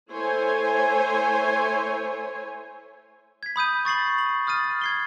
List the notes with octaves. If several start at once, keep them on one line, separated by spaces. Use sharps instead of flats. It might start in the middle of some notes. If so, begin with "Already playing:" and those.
A3 E4 C5 C#5 G#5
G#6 B6
B5 D#6 G6 D#7
C#6 A6 C7 F#7
F#7
D#6 F6 A6 D#7
G#6 C7 G7